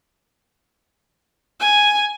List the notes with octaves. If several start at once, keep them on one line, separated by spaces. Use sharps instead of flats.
G#5